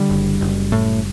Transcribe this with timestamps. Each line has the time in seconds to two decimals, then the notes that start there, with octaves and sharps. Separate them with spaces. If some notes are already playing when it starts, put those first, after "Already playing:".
Already playing: D3 G3
0.10 F#1
0.41 F#1
0.72 A2